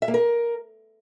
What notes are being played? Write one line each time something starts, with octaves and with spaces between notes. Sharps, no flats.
E5
A#3
A#4